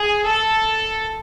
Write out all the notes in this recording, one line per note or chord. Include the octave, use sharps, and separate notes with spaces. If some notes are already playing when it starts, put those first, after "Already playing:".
Already playing: G#4
A4